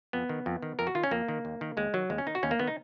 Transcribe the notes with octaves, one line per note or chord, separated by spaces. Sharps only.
F2 B3
D#3
F2
D#3
F2 A#4
F#4
D#3 F4
C#4
F2 A#3
D#3
D#2
D#3
D#2 G#3
D#3 F#3
D#2 G#3
C#4
D#3 D#4
F#4
D#2 C#4
A#3
D#3 B3
D#4